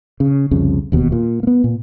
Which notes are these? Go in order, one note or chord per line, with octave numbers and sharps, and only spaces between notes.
C#3
C2 F2 C#3
E1 D#2 B2
A#2
A#3 B3
A#2